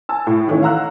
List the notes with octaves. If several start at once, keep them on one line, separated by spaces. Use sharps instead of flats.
G#5 A5 E6
A2
D#3 E3 A3 C#4 D#4
F5 F#5 A#5 E6 F#6